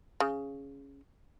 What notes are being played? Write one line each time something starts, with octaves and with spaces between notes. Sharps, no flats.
C#3